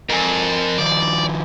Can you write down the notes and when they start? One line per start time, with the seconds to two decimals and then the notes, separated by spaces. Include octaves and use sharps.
0.10 F2 A#4 G#5
0.78 D#3 F3 D5